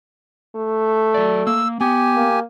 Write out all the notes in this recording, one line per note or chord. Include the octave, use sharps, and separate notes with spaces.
A3
F#3 D5
A#3 E6
B3 G4 G#5
A#3